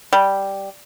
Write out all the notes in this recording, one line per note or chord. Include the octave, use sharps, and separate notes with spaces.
G3